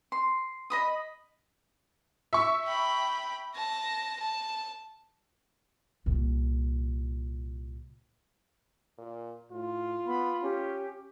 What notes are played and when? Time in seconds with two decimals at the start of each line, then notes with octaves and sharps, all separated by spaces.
0.12 C6
0.70 D#5 B5 D#6
2.33 E5 C#6
2.65 G5 B5
3.56 A5 A#6
4.20 A5
6.06 C2 A#2
8.98 A#2
9.52 A2 F4
10.07 B3 B5
10.43 C#4 G4